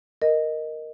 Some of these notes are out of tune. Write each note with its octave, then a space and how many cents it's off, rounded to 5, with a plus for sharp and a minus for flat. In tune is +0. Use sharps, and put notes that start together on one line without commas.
A#4 +0 D#5 +0